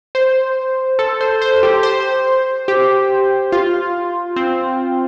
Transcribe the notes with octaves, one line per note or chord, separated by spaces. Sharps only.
C5
A4
C5
C5
G4
C5
G4
F4
C4